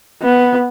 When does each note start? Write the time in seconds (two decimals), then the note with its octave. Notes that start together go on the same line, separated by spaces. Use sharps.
0.22 B3